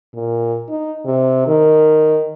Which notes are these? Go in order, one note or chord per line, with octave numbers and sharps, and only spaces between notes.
A#2
D#4
C3
D#3